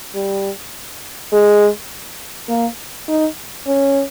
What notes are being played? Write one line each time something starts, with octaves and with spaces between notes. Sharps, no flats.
G3
G#3
A#3
D#4
C#4